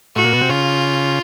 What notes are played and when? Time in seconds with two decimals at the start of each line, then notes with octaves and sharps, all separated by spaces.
0.16 A2 F#4
0.24 A#2
0.33 B2
0.41 C3
0.49 C#3 F4